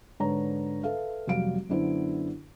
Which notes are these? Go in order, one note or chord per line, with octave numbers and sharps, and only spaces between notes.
G#2 D3 B4 C#5 A#5
A4 B4 E5 F5
F1 F#3 G3 F5 D7
F#2 D3 B3 E4 C5